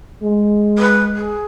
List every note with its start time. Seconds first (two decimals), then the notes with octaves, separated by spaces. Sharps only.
0.23 G#3
0.78 B4
1.15 G#4